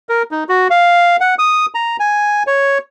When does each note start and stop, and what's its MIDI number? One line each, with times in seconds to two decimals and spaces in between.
0.09 0.23 70
0.31 0.44 63
0.49 0.68 66
0.70 1.17 77
1.20 1.35 78
1.39 1.66 87
1.75 1.97 82
2.00 2.43 80
2.47 2.78 73